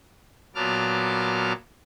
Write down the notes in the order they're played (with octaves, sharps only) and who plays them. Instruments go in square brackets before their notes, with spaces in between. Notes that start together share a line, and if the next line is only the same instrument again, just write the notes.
[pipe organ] A#2 F#3 B3 A5 D6 F6